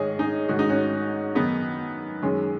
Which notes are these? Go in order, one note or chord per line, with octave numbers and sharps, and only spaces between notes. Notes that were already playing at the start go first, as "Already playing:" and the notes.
Already playing: G#2 D#3 G#4 C#5 D#5
D#4 G#4
G#2 D#3 F#4
D#4
C#4 F#4
F#2 D#3 B3 D#4
F#2 D#3 G#3 C#4